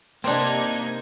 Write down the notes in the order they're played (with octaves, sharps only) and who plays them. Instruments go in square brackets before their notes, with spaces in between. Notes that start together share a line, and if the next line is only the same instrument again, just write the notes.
[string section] C3 D#4 G#6 [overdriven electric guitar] A#3 [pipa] C4 D4